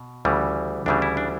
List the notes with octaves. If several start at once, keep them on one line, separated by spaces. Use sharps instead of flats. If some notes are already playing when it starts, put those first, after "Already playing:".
Already playing: B2
D2 C#3 E3 G3
D2 C#3 E3 G3 D4
E4
D4